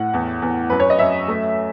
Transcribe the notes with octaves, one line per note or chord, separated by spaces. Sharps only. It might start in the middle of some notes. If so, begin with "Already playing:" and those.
Already playing: A2 F#5
E2
E2
F#2 B4
C#5
D#5
F#2 E5
A3